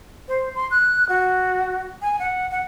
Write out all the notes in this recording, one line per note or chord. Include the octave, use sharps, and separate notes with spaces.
C5
C6
F#6
F#4
G#5
F#5
F#5